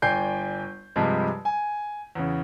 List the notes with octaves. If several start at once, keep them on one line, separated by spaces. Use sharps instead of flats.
G1 D5 G5 G#5 G6 C7
G2 C3 F3 G3 G#3
G#5
E2 C#3